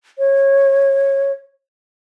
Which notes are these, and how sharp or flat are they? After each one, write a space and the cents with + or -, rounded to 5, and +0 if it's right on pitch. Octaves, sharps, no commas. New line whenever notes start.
C#5 -15